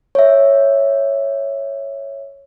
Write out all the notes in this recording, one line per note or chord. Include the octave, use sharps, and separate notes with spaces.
C#5 E5